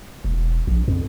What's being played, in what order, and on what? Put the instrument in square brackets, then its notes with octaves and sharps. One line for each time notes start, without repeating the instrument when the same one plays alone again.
[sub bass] E1
A#1
F2